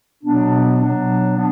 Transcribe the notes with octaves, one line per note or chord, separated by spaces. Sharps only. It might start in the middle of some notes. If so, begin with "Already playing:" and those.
B2 F#3 B3 D4
B2 F#3 B3 D4
B3 D4